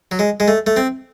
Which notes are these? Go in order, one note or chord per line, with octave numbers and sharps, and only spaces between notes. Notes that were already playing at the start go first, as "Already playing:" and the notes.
F#3
G#3
G#3
A3
A3
C4